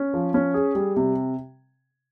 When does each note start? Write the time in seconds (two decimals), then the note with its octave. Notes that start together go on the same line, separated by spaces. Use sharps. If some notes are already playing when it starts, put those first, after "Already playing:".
Already playing: C#4
0.14 F3
0.34 C#4
0.54 G#4
0.75 G3
0.97 C3